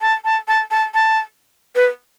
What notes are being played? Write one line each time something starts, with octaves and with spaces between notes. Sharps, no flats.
A5
A5
A5
A5
A5
B4